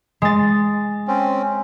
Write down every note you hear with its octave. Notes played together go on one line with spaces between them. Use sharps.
G#3 A6
C4 C#4